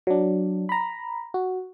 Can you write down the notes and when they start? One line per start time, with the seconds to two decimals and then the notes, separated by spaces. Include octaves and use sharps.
0.07 F#3 D4
0.69 A#5 B5
1.34 F#4